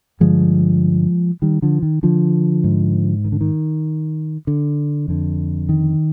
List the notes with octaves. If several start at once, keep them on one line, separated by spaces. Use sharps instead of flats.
G2 D3 F3 G#3
D#3 G3
D3 F3
D#3
D3 F3
G#2
D#3
D3
D#3
D3
F2 D3
D#3